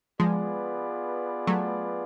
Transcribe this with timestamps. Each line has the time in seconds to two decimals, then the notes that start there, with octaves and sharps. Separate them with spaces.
0.20 F3 G#3 B3 F4 G#4 B4 D5
1.47 F#3 A3